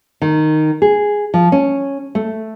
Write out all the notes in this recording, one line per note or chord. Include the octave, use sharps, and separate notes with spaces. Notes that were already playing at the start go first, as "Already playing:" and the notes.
D#3
G#4
F3
C#4
A3